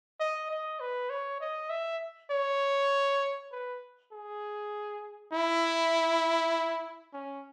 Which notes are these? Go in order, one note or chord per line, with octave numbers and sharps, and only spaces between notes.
D#5
D#5
B4
C#5
D#5
E5
C#5
B4
G#4
E4
C#4